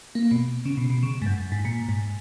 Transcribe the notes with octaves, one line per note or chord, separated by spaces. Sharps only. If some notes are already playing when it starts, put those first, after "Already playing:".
A#3
B2
C#3
B2
B2
C#3
G#2
F#2
G#2
A#2
G#2